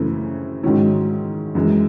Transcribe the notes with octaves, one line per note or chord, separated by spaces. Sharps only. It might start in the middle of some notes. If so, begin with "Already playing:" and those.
Already playing: F#2 C#3 E3 A3 C4
G#2 D#3 F#3 C#4 E4
F#2 E3 G#3